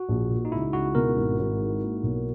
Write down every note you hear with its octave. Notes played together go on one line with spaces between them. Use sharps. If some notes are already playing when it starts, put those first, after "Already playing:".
Already playing: F#4
A#1
A#2
D#4
C#2 E4
C#2 F#4
B2 A#4
G#1
G#1
G#2
A#3
B1